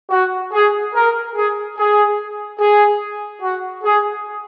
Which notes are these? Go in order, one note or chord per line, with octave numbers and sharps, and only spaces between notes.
F#4
G#4
A#4
G#4
G#4
G#4
F#4
G#4